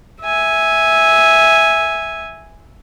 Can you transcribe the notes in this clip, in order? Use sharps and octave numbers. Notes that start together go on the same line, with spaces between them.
E5 G#5